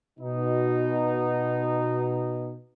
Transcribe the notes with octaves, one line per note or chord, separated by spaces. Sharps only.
B2 D#4